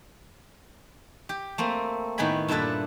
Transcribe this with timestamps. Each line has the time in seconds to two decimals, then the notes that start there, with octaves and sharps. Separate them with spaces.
1.29 G4
1.58 A3 A#3 C4
2.18 A2 D#3 B3 G5 G#5 B5
2.48 G2 A#2 D4 E4 A4 B4